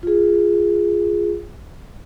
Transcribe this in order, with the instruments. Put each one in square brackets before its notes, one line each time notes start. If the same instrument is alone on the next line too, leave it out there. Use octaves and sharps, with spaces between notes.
[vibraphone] F4 G#4